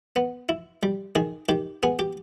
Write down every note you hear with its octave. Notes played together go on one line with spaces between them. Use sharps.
B3
E4
G3
D#3 G#4
D#3 G4
B3 G#4
G4